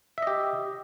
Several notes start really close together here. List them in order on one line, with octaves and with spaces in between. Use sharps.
E5 D#5 G4